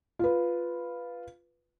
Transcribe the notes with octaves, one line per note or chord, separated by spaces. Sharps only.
F4 B4